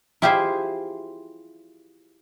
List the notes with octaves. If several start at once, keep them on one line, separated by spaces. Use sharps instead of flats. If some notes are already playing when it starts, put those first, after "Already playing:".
E4 F4 G4 G#4 C5 E5